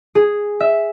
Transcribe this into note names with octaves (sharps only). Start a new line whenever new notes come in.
G#4
E5